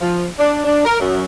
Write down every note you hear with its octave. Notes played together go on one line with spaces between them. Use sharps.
F3
D4
D4
A#4
F#2